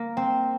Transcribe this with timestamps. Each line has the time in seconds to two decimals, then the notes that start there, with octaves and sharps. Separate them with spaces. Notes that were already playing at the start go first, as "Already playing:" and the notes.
Already playing: A#3
0.17 C4